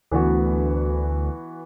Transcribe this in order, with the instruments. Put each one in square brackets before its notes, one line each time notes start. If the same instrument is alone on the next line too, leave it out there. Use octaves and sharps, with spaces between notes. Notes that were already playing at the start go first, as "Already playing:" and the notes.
[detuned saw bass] D2 [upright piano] E3 B3 F#4